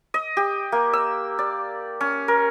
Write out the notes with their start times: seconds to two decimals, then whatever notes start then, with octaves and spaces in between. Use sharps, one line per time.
0.14 D#5
0.37 G4
0.72 A#3
0.93 E6
1.39 D5
2.01 C#4
2.28 A#4